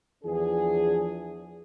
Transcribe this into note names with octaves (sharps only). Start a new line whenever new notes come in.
E2 E3 F3 D4 G#4